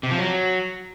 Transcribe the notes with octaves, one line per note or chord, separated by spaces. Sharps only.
C3
F3
F#3